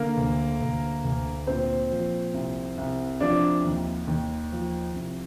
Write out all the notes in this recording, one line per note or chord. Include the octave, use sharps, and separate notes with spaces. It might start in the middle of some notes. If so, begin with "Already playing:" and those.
Already playing: D3 A#3 A#4
D2
D2
D2
A#2 C4 C5
F3
C2
C2
F3 D4 D5
D#2
D#2
F3
C2